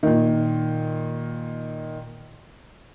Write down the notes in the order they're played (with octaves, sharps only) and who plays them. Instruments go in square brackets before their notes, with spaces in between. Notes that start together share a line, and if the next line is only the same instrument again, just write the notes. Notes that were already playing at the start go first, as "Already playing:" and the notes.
[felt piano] A#2 D#3